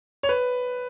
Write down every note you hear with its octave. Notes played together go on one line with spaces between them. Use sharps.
C#5
B4